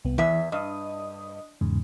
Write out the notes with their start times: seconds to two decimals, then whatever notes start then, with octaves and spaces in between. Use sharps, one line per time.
0.05 C2 B3
0.18 E2 E3 E5
0.52 G2 D#5 D#6
1.61 E2 G#2 C#3